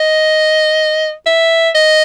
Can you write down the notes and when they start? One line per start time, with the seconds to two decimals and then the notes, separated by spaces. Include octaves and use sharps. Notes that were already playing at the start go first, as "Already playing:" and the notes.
Already playing: D#5
1.26 E5
1.75 D#5